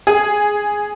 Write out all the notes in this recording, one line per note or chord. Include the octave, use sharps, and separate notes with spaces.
G#4